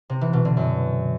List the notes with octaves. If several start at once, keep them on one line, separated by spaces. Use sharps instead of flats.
C3
E3
B2
D3
F#2